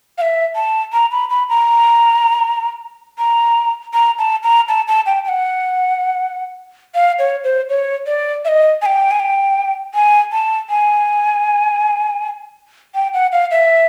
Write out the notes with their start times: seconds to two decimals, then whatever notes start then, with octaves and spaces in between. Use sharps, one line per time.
0.18 F5
0.21 E5
0.55 A5
0.93 A#5
1.12 B5
1.30 B5
1.50 A#5
3.19 A#5
3.93 A#5
4.19 A5
4.43 A#5
4.69 A5
4.88 A5
5.06 G5
5.25 G5
5.29 F#5
6.94 F5
7.19 C#5
7.44 C5
7.69 C#5
8.06 D5
8.45 E5
8.48 D#5
8.82 G#5
8.86 G5
9.11 G#5
9.20 G5
9.94 G#5
10.32 A5
10.70 G#5
12.95 G5
13.14 F#5
13.32 F5
13.51 E5